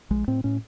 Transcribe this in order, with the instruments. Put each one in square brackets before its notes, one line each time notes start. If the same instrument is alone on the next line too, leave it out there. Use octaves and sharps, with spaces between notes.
[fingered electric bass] A#1 G#3
A2 C4
A2 C#4